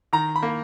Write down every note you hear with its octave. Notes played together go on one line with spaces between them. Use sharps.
D#3 A#5
B5
A#3